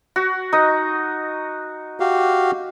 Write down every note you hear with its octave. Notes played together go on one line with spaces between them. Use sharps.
F#4
D#4 D#5
F#4 G4 F5